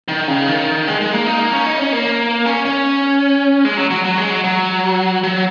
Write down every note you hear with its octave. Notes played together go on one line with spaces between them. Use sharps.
D#3
C#3
D#3
G#3
G#3
A#3
D#4
A#3
C#4
D#4
C#4
A#3
C#4
C#4
G#3
F#3
F#3
F#3
G#3
F#3
F#3
F#3